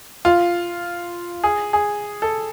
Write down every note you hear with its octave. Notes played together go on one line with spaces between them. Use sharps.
F4
G#4
G#4
A4